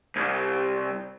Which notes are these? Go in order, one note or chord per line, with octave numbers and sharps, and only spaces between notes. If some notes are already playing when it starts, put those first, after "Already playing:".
C2